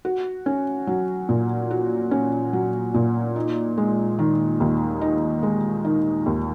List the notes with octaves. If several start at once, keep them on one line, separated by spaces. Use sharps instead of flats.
F#4
C#4
F#3
A#2
F#4
C#4
F#3
A#2
D#4
G#3
D#3
D#2
D#4
G#3
D#3
D#2